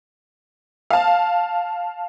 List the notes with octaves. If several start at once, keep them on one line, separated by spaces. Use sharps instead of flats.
F5 A5